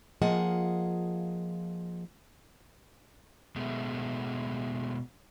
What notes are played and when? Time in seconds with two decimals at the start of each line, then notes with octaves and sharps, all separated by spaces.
0.21 F3 A#3 F4 G#4 D#5 F#5
3.56 B2 G#3 A3